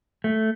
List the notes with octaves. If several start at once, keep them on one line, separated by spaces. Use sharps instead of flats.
A3